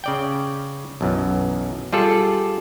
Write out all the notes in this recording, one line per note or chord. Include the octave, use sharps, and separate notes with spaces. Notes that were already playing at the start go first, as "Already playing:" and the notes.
C#3 D5 G5
B1 F#2 E3
G3 F4 G#4 A4 D5